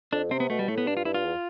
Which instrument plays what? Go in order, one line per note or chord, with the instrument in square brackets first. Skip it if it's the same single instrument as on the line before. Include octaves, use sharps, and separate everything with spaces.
[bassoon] F2 [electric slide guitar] D4
[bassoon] C3 [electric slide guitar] C4
[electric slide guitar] B3
[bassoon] B2 [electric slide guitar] A3
[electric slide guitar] G3
[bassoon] A2 [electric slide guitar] A3
[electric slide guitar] B3
[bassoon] G2 [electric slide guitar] D4
[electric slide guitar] F4
[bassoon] G2 [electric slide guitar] E4
[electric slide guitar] F4
[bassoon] E2